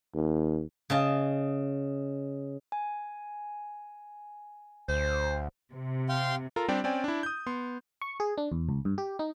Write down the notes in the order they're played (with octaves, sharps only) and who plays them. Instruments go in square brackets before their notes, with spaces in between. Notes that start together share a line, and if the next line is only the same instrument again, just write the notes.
[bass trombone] D#2
[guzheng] C#3 D#5 A5
[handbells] G#5
[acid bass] D2 [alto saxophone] C5
[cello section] C3
[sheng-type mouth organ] F5 G5 C6
[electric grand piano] F4 A4 A#4 A#5
G3 C4 D4 G4 D5 G5
C4 C#4 D5 G5 G#5
D4 E4
D#6 G6
B3 C6
[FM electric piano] C#6
G#4
D4
E2
C#2
G2
G4
D#4